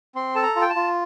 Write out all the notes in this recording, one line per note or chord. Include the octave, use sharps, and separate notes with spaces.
C4 C6
A4 A5
A#5
F4
G5
A5
F4